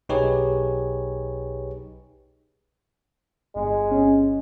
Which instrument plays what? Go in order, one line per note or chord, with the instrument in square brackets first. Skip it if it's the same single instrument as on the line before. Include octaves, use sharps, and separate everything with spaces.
[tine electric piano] B1 D#4 G4 G#4 B4 C#5
[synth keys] G1 [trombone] G#3
[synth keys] G1 C#4